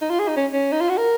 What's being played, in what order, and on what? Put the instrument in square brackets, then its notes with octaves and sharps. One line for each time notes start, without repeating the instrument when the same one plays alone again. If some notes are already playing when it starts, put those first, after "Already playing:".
[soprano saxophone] D#4
F4
G#4
D#4
C#4
C#4
D#4
F4
F#4
A#4